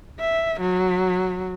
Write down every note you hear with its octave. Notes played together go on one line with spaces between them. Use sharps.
E5
F#3